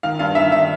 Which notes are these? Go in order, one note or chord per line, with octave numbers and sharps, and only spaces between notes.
D#3 F5
G2 F5
D#3 E5
D#3 E5